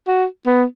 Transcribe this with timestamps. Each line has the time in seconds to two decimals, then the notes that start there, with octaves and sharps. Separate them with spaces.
0.07 F#4
0.46 B3